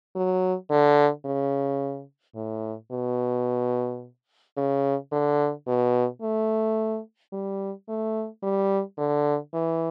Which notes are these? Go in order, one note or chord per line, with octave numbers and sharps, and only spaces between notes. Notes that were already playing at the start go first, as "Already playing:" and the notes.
F#3
D3
C#3
A2
B2
C#3
D3
B2
A3
G3
A3
G3
D3
E3